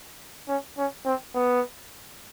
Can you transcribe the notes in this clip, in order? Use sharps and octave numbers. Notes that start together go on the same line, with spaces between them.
C#4
C#4
C4
B3